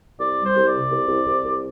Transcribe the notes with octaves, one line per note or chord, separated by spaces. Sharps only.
C2 D5
G3
C5
C2
D5
C3
C2
C2
C2
C2